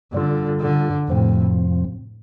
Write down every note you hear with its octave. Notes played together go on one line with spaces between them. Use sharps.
G2 D3 G3 F4 A4
D3
F2 A2 C3 F3 C4